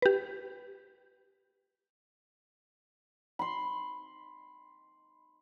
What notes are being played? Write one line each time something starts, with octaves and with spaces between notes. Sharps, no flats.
G4 B4
B5 C6